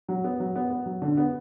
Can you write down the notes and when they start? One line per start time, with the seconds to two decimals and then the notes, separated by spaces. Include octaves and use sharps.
0.08 F#3
0.24 B3
0.40 F#3
0.55 B3
0.70 B3
0.86 F#3
1.02 D3
1.17 B3